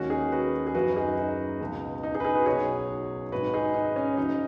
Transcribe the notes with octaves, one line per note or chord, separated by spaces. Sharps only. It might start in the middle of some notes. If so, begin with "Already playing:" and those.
Already playing: D#2 D#3 G#3 C#4 F#4
D#4 G#4
F#4 B4
G#4
F#1 F#2 F#3 F#4 B4
D#4 G#4
D#4
C#2 B2 G#3
D#4
D#4 G#4
B4
D#4 G#4
F#4 B4
B1 B2 F#3 G#4 C#5
G#1 G#2 G#3 F#4 B4
D#4 G#4
D#4
C#4
F#1 F#2 F#3 D#4